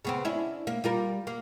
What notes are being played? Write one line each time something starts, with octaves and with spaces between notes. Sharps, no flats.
C#3 B3 C4
C#4 D4 E4
A#3
G3 F4 A#4
A#3